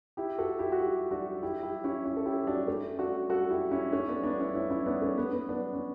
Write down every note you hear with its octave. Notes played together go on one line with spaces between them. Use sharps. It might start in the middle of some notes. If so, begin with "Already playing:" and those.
E4 G4
F#4 A4
E4 G4
F#4
E4 G4
D4 F#4
E4 G4
E4 G4
C#4 E4
C#4 E4
A4
E4 G4
D4 F#4
A3 C#4
D4 F#4
F#4 A4
E4 G4
C#4 E4
A3 C#4
B3 D4
B3 D4
C#4 E4
C#4 E4
C#4 E4
B3 D4
A3 C#4
B3
B3
B3 D4
C#4